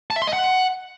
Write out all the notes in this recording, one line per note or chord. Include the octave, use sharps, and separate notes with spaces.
A5
E5
C6
D#5
F#5